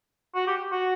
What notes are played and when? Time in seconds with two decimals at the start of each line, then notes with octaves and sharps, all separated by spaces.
0.35 F#4
0.47 G4
0.71 F#4